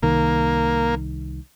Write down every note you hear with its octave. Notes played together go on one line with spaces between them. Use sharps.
C2 D#3 A#3